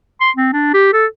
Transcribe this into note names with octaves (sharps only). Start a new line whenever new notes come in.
C6
C4
D4
G4
A4